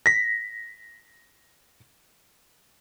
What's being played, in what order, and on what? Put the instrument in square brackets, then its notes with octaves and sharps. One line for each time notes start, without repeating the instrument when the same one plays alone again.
[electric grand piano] A#6 B6